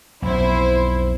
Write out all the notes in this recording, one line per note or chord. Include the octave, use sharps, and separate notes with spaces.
B1 F2 E4 C5